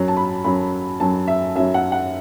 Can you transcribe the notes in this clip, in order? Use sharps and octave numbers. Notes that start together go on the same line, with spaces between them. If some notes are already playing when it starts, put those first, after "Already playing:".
Already playing: F#2 F#3
A5
B5
F#2 F#3 B5
F#2 F#3 A5
E5
F#2 F#3 E5
F#5
F#5